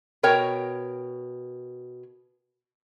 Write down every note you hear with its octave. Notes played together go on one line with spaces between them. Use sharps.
B2 A#4 C#5 G5